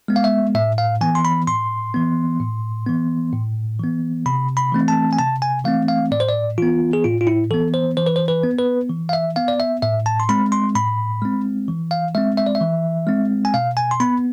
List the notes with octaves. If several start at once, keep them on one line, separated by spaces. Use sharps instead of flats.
G#3 B3
F5
E5
A2 E5
F5
E3 B3 G#5
C6
B5
A2 C6
E3 B3
A2
E3 B3
A2
E3 B3
C3 B5
B5
E3 A3 C4
A5
G#5
C3 A5
G#5
E3 A3 C4 F5
F5
A2 D5
C5
D5
E3 B3 F4
G#4
A2 F4
F4
E4
E3 B3 A4
C5
E3 C5
B4
C5
B4
B3
B4
E3
F5
E5
B3 F5
D5
E5
A2 E5
A5
C6
G#3 C4 B5
C6
A2 B5
G#3 C4
E3
F5
G#3 C4 E5
E5
D5
E5
E3
G#3 C4
G#5
B2 F5
G#5
C6
B3 B5